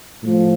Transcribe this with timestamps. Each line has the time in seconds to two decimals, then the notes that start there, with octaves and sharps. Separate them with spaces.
0.23 A2 F3